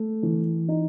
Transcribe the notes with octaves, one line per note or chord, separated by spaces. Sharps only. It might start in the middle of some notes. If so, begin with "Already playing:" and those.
Already playing: A3
E3
D#4